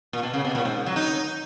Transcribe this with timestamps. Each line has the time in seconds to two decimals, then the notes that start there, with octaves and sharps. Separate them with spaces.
0.13 A#2
0.23 B2
0.34 C#3
0.45 B2
0.55 A#2
0.65 G#2
0.86 F#3
0.96 D#4